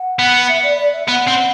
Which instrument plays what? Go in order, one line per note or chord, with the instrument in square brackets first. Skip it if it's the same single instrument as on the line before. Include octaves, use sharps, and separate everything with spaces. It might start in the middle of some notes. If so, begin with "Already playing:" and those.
Already playing: [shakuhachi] F#5
[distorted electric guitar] B3
[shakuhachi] E5
D5
D5
E5
[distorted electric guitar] B3 [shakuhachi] F#5
[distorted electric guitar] C4